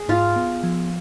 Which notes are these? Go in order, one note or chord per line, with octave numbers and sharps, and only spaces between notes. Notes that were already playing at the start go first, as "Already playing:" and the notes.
Already playing: G#4
G#2 F4
B3
F3